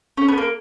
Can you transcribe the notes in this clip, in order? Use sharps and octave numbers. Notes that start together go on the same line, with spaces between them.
C#4
B3
A#3